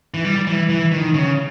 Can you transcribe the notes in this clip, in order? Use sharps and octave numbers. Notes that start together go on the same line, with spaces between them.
E3
G3
E3
E3
D#3
C#3